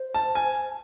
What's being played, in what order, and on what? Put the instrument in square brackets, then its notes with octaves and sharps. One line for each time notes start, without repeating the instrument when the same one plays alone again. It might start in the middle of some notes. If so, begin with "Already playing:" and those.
Already playing: [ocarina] C5
[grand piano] A5
G#5